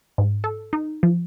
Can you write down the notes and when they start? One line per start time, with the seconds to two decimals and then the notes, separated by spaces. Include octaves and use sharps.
0.18 G#2
0.44 A4
0.73 D#4
1.03 F3